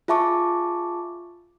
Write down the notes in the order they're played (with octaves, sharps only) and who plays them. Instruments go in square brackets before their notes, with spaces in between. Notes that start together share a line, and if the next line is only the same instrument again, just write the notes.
[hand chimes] F4 G#4 E5 A5 C#6 D6